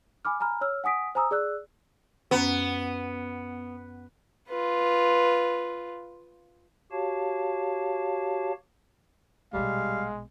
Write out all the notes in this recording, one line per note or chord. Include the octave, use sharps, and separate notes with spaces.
G#5 B5 D6 F6
G#5 A#5 B5 F6
C#5 E6 F6
F#5 G#5 D#6 B6 D7
C5 G#5 A#5 D#6 E6
G#4 D5 E6 F#6
F#2 B3 C#4
F4 B4
F#4 G4 C#5 F5 A5
A#1 B2 G3 G#3 F5